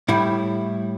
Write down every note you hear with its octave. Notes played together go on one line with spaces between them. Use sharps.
A2 G3 E4